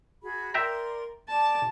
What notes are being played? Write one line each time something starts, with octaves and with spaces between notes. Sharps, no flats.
F#4 G#4 B5
A#4 D5 E5 G5 A#5 C6
D5 A5